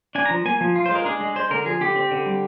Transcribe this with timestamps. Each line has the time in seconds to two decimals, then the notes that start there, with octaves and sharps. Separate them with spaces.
0.15 D4 G#5
0.26 A#5
0.30 F3
0.45 A#3 G#5
0.61 F3
0.76 F4
0.86 C5
0.91 G#3 A#4
1.05 D4 G#4
1.21 G#3
1.36 G#3 C5
1.50 D3 A#4
1.66 F3 G#4
1.81 D3 G4
1.96 C4
2.11 D3
2.26 G3